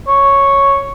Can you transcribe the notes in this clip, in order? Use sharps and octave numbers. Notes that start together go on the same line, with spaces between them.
C#5